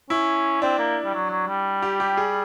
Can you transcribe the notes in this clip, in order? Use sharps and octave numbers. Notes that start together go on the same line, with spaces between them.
C#4 E4
C4 D4
A#3
G3
F#3
F#3
G3
G4
G4
G#4